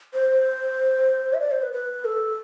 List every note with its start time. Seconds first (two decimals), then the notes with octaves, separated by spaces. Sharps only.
0.14 C5
1.34 E5
1.41 D5
1.51 C5
1.62 B4
1.73 B4
2.05 A4